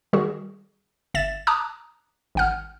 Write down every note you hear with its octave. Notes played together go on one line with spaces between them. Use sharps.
D#3 G3 F#4 G#4
G1 E5 A6 E7
A5 A#5 D6 D#6 F#6
G#1 F#5 F6